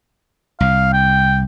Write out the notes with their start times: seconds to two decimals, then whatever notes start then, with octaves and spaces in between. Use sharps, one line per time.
0.60 C2 F5
0.93 G5